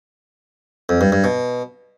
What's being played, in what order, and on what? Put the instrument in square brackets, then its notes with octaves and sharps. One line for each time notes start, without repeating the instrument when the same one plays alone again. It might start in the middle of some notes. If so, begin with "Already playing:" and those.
[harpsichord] F2
G2
G2
B2